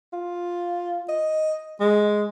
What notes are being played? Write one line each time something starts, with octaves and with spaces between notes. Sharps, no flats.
F4
D#5
G#3